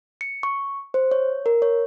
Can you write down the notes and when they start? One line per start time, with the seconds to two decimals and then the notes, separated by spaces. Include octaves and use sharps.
0.21 C#7
0.43 C#6
0.94 C5
1.11 C#5
1.46 A#4
1.62 C#5